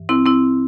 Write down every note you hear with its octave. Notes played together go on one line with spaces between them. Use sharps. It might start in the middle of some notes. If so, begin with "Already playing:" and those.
Already playing: G2 E3
C4 E4
C4 E4